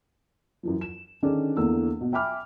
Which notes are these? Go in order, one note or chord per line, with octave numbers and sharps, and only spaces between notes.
F#2 E3 F3
E7
D3 D#3 C#4 D4 G#4 D5
E2 D3 E3 A#3 E6
B2
E5 G5 G#5 B5 D6 F6